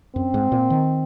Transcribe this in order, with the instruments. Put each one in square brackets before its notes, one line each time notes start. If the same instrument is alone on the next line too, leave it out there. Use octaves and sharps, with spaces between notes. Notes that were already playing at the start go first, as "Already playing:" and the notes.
[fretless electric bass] F#2 [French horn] C4
[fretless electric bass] G#2
A#2
D#3